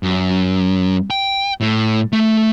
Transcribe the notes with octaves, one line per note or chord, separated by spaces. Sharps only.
F#2
G5
A2
A3